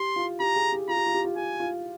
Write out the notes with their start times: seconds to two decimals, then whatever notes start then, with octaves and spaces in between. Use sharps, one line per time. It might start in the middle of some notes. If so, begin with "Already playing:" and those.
Already playing: G4 C6
0.16 F4
0.40 G4 A#5
0.56 G#4
0.73 G4
0.88 F4 A#5
0.97 G4
1.06 F4
1.15 G4
1.24 F4
1.36 G4 G#5
1.60 F4